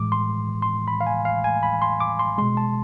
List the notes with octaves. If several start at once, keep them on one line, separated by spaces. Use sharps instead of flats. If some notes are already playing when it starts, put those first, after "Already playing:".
Already playing: A2 E3 G#3 D6
C6
C6
B5
F5
G#5
F5
G#5
B5
C6
D6
C6
B2 G#3 C6
A5